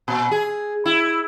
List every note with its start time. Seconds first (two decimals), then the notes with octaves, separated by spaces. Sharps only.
0.08 A#2
0.31 G#4
0.86 E4